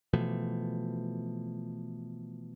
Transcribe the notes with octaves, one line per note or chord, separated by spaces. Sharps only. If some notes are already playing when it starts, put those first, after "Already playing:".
B2 E3 F3 A3